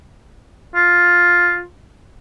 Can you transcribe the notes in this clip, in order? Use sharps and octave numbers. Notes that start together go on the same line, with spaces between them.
F4